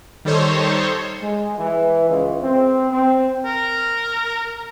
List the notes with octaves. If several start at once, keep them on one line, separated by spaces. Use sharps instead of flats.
D#3 G3 D#4 A4 C5 C#5
G#3
E3
C#2
C4
C4
A#4